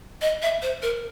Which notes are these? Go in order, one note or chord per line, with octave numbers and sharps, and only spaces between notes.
D#5
E5
C5
A#4